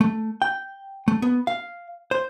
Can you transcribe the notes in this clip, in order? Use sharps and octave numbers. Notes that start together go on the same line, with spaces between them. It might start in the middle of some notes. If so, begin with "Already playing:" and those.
A3
G5
A3
B3
F5
C5